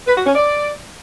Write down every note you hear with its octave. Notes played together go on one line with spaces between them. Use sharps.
B4
F#4
C#4
D5